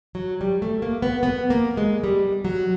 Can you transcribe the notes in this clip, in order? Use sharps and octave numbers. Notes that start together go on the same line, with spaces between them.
F#3
G3
A3
A#3
B3
B3
A#3
G#3
G3
F#3